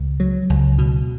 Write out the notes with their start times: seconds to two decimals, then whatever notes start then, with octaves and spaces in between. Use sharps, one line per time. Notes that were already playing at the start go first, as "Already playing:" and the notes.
Already playing: C#2
0.20 F#3
0.50 C#2
0.78 B2